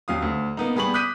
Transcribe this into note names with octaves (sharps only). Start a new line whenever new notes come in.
D#2 F#3 F5 D#6
D2
A#3 B3 D#4
G3 B3 G#4 B5 C#6 F#7
D6 D#6 F#6 G6 B6 D#7